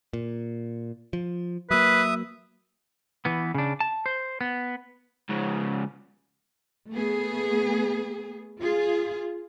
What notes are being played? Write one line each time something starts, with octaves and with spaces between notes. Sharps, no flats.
A#2
F3
F#3 A#3 B4 E5 D#6
E3 B3
C#3 D4
A5
C5
B3
G#2 C#3
A3 B3 G#4
F4 G#4